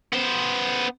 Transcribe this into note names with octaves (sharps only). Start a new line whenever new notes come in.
B3 C5